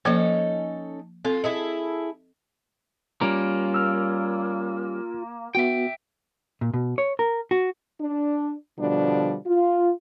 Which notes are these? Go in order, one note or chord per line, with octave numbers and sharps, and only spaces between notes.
F3 A#3 C#4 D#4 A4 C5
C4 F4 A4
E4 G#4 A4 D#5
G3 A#3 C#4 F4 A#4
E6 F6
B3 F#4 E5 G5
A#2
B2
C#5
A#4
F#4
D4
B2 D3 F3 G3 D4
F4